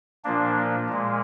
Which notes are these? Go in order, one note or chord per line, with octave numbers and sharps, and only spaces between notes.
A#2 F3 A#3 D4
A#2 G#3